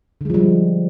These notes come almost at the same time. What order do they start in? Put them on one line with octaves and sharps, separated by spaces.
D3 G#3 F3 G3